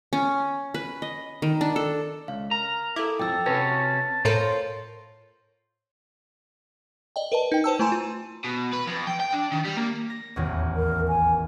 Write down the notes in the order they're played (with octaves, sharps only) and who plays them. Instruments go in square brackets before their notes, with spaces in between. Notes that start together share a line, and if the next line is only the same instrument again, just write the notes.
[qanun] C#4
B4
D#5
D#3
D4
A4
[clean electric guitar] C#2 [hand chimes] F5
[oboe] A#4 [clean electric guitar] A#5
[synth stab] E4 [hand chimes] A4 D6
[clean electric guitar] B1 F2 [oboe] A4 [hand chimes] G5 E6
[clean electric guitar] C3 C#4 F#4 [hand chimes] B4 [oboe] A5
[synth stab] A2 A4 A#4 [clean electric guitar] F4 [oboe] C5 [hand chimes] C#5
[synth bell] D5 D#5 G5
A#4 B4 D#5 A5
D#4 G5
B4 C5 A5 E6
A3 E4 G#5 A#5 C6 E7
F4
[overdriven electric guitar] B2
B4
F2
G5
G5
D4
D#3
G3
A#3
[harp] A#6
D#1 A1 E2
[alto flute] A#4
G#5